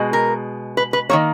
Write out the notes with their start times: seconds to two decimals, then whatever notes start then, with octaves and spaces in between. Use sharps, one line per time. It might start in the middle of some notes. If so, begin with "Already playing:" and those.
Already playing: B2 G#3
0.13 A#4
0.77 B4
0.93 B4
1.09 D#3 F#3 A#3 C#5